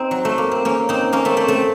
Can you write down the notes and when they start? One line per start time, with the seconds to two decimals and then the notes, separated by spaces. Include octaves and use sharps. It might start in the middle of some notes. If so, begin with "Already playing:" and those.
Already playing: C4 D#4
0.11 F#3
0.25 A3
0.38 A#3
0.52 C4
0.65 A#3 C#4
0.89 C4 D#4
1.13 A#3 C#4
1.25 A3 C4
1.37 A3 C4
1.48 A3 C4